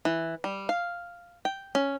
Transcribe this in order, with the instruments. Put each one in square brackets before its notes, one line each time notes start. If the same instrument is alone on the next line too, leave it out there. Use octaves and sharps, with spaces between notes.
[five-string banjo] E3
G3
F5
G5
C#4